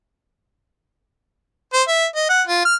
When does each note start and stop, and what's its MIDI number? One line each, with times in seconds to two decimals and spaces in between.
1.73 1.82 72
1.88 2.06 76
2.15 2.26 75
2.29 2.42 78
2.47 2.64 65
2.65 2.75 89